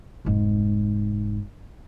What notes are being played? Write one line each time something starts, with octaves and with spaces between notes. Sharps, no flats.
F1 G#2